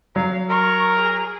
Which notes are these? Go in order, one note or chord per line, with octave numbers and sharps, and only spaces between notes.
F#3 F5
A#4 C#6
G#4